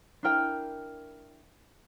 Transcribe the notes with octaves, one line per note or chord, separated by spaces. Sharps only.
D4 E4 A#4 G5